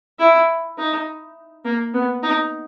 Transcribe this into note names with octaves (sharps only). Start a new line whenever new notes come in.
E4
D#4
A#3
B3
D#4